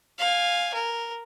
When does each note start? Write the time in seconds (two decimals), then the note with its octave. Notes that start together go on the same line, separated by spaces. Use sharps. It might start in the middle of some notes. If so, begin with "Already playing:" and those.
0.19 F5 G#5
0.74 A#4